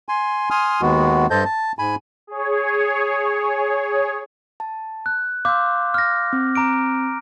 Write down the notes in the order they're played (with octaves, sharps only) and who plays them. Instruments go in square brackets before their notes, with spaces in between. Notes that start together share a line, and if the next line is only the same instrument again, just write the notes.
[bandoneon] G#5 C6
G#5 C6 D#6 F6
D#2 D#3 G#3 B3 F#4
G2 A4 C5 D#5 A5 G6
A5
G#2 G#5 B5
[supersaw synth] G#4 C#5
[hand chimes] A5
[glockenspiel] F#6
[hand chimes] F5 C6 E6 [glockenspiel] D6 G6
[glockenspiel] F6 A#6
[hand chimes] C4
[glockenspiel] A#5 D6 D7